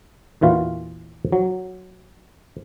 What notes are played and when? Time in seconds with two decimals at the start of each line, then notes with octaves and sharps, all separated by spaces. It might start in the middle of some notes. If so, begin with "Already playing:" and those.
0.41 E2 A#2 E3 F4 F#4
1.32 F#3